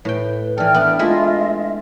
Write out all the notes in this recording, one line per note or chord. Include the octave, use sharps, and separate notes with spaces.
A2 B4 G5
E3 A4 D5 G5 F6
B3 D4 E5
G#3 A3 E4 F4 D#5